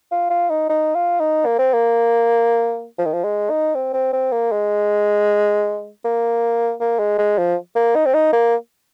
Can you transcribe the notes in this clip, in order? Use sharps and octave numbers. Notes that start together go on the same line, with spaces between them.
F4
F4
D#4
D#4
F4
D#4
A#3
C4
A#3
F3
D#3
F3
G#3
D#4
C4
C4
C4
A#3
G#3
A#3
A#3
G#3
G#3
F3
A#3
D#4
C4
D#4
A#3